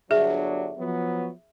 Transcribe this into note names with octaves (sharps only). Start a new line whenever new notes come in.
G1 F#3 D4 G#4 E5
F3 F#3 B3